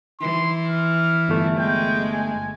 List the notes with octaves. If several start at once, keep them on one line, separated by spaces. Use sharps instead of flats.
E3 C6
F6
G1 A3
G#3 G5
G#5